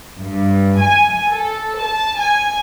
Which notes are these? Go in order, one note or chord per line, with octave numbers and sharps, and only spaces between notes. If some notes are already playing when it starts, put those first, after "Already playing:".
G2
G#5
A4
A5
G#5